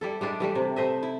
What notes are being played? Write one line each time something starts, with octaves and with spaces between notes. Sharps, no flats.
G3 E4 A4
G3 G#3 D4 E4
E3 G3 A3
C3
A3 C5 D#5 E5
E4